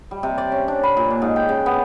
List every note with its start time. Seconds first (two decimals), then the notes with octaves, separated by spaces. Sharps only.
0.11 G3
0.23 C3
0.38 D5
0.52 C#4
0.68 D4
0.83 B5
0.97 A#2
1.10 D4
1.22 G#2
1.36 G5
1.49 C#3
1.66 B3